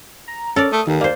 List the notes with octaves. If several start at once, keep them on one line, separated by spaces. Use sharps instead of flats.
A#5
C#4 A4 A#4 D5
A3 D#6
D#2 D#3
A#3 C5 D5